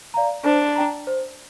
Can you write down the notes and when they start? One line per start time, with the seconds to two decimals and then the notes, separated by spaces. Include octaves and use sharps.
0.14 D5 F5 A#5
0.45 D4 C5
0.76 G5 A#5
1.07 C5